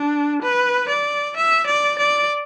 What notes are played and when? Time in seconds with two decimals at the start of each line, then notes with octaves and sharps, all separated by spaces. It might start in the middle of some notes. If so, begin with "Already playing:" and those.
Already playing: D4
0.42 B4
0.89 D5
1.36 E5
1.67 D5
1.98 D5